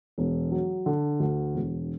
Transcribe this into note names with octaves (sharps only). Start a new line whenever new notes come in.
E1
F#3
D3
D2
E1